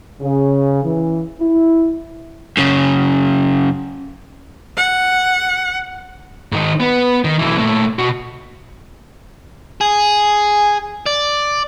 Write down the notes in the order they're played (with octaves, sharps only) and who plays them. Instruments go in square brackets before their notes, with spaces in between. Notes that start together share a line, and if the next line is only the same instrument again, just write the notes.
[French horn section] C#3
E3
E4
[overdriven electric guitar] F#2 C#3
[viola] F#5
[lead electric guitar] G#2 D#3
B3
D#3
B1 E3
A#2 A3
B2 F#4
[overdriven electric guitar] G#4
D5